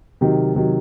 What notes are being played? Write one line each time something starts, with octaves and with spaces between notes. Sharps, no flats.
C3 D#3 F#3
C3 D#3 F#3